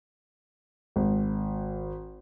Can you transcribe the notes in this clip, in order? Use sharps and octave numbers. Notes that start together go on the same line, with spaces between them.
G#1